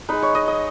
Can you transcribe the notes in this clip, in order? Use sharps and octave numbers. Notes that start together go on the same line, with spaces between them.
G#3 D#4 B4
C#5
D#5
D#5